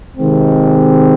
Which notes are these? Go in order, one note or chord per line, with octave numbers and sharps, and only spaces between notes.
C3 D#3 G#3 C4